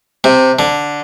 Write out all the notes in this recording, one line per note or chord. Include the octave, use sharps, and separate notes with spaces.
C3
D3